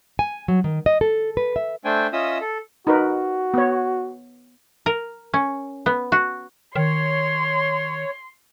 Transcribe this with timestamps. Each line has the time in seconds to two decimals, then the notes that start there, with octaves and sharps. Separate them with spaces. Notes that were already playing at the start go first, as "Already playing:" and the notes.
0.19 G#5
0.48 F#3
0.64 D#3
0.86 D#5
1.01 A4
1.37 B4
1.56 E5
1.85 A3 D4 C5 G5 G#5
2.13 C#4 F4 D#5 E5 D#6 E6
2.41 A4
2.87 D#4 F#4 A#4 B4
3.54 B3 C#5
4.86 A#4
5.33 C#4
5.86 B3
6.12 F#4
6.76 D#3 C#5 C6